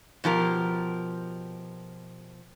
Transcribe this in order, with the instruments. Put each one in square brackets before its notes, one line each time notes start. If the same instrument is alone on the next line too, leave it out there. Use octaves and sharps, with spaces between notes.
[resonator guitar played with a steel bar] B2 F3 G4 A#4